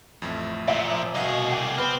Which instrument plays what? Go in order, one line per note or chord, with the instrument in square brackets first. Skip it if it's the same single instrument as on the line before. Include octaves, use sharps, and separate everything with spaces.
[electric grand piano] A1 F2 [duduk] A3
[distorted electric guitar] A#2 [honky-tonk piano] E5
[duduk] F3
[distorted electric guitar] C2 G#4 [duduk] B2 [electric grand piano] D#5 F5 F#5
[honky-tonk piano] G5 D6
[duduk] B3 [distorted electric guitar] C4 [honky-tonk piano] B4 [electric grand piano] F6